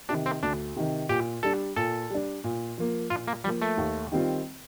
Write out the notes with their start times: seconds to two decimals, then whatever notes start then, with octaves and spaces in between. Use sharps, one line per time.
0.09 C3 D#3 D4
0.26 C4
0.43 D2 D4
0.76 C3 D#3
1.09 A#2 G4
1.43 G3 D4 A4
1.76 A#2 A4
2.10 G3 D4
2.44 A#2
2.78 F3 A#3
3.10 A#2 F4
3.28 A#3
3.44 F3 G3
3.48 A#3
3.62 A3
3.78 D#2
4.12 D#3 G3 C4 F4